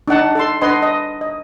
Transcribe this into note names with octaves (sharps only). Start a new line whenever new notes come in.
D4 D#4 F#5 A5
A4 A5 C6
D4 B4 D#5 F#5 C6
D#5
D#5